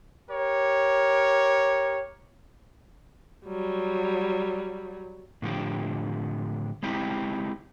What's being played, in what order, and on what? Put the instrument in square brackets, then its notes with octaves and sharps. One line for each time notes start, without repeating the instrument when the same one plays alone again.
[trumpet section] G4 A#4 C#5
[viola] F#3 G3
[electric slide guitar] A2 D3 F3 G4
G#3 C4 D#4 E4 G4